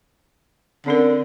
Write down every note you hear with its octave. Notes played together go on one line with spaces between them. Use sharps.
D3 C4 C#4 A#4